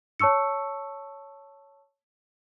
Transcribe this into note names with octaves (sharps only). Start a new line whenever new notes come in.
C#5 A5 C#6 E6 C#7